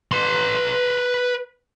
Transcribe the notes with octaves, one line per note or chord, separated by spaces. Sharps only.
B4 C6